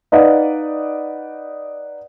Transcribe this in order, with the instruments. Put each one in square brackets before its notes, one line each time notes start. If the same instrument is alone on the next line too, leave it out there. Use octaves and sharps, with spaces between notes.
[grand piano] D#4 B4 D5 D#5 F5 F#5